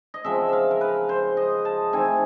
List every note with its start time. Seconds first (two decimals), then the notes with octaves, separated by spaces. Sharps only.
0.14 D#5
0.24 C#3 F3 G#3 C4 E5
0.49 E5 F5
0.71 A#4
0.81 B4
1.09 C5
1.37 D#5
1.65 A5
1.93 E3 A3 C4 D#4 G#5